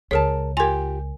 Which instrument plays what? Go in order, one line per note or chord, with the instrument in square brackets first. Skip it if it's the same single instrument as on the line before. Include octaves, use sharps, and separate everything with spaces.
[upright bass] C#2 [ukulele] G#4 A#4 A5 [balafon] C#5
[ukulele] F4 G4 [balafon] A#4 G#5